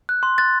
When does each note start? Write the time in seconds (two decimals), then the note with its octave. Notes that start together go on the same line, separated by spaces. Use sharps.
0.09 F#6
0.23 C6
0.38 F#6 A6